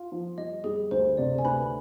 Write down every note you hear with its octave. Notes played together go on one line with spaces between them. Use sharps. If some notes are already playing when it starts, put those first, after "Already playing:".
Already playing: F4
F3
G3 D#5
G3 G#4
D2 C5
C3 D5
G#5
D2 B4 B5